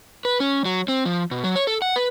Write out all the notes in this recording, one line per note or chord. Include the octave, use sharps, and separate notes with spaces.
B4
C#4
F#3
C4
F3
B2
F#3
C#5
A4
F#5
B4